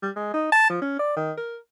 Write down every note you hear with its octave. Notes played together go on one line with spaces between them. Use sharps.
G3
G#3
D#4
A5
F3
C#4
D5
D#3
A#4